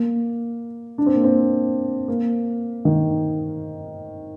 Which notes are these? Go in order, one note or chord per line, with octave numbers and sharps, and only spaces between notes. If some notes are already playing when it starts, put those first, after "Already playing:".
Already playing: A#3
D4
C4
A#3
C4
A#3
D#3